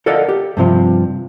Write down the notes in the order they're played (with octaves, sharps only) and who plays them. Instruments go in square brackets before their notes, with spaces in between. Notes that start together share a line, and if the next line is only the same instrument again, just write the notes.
[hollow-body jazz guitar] A4 A#4 D5 D#5 F5 F#5
G4
G2 C3 F3